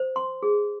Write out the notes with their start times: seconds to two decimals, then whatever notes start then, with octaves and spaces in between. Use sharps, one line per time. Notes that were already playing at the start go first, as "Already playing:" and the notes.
Already playing: C5
0.16 C6
0.43 G#4